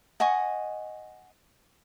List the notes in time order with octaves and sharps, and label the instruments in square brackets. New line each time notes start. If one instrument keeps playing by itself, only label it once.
[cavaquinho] D#5 F#5 G#5 C#6